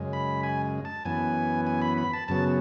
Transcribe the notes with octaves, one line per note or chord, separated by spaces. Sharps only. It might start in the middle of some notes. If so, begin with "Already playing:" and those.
Already playing: F#2 C#3 G#3
B5
G#5
A5
F#2 E3 B3 G#5
G#5
B5
B5
A5
F#2 C#3 F#3 B3 A5